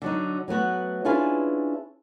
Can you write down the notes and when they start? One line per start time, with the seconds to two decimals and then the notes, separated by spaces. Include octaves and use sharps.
0.02 D3 F#3 D#4
0.48 F#3 A3 B3 F#4
1.05 C#4 D4 E4 F4 G#4 B4